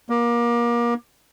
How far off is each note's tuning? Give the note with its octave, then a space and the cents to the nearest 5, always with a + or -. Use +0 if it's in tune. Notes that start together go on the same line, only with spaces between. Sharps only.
A#3 +30